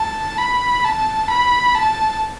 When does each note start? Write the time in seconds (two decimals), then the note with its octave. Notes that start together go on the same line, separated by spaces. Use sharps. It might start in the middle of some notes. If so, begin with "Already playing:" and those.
Already playing: A5
0.38 B5
0.84 A5
1.30 B5
1.75 A5